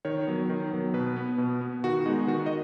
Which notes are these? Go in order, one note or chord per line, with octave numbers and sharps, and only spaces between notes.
D#3 C#5
F#3 B3
D#3
F#3 B3
B2 B4
B3
B2
B3
D#3 F#4
G#3 B3 D#4
D#3 F#4
D#5